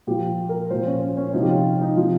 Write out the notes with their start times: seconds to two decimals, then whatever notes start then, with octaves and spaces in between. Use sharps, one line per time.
0.07 A#2 F3 G4
0.49 A#4
0.71 A#2 F3 C5
0.87 C#4
1.17 C#4
1.33 C3 F3 D#4
1.42 G4
1.50 F4
1.82 D#4
1.97 C3 F3